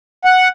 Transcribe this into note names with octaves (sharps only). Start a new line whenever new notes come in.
F#5